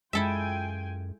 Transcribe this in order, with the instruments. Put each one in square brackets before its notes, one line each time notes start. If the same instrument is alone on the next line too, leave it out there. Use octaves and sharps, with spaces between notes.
[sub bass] F#2 [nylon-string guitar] G#3 [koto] E4 A4 E5 [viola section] F4 G5 G#5